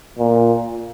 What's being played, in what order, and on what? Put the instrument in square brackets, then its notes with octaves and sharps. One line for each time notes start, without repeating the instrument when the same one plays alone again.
[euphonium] A#2